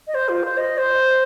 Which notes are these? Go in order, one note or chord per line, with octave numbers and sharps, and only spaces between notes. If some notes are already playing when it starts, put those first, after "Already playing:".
D#5
C5
F4
C5
D#5
C5